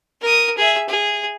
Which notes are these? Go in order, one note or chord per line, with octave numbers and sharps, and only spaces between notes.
A#4 D#6
G#4 E5
G#4